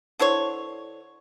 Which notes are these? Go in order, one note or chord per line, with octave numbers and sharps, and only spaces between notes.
D3 E4 C5 C#5